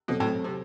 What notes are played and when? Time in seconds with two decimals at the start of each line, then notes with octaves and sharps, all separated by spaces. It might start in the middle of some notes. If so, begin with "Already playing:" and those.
0.08 B2 F#3 C4 F#4 A4
0.20 A2
0.44 C3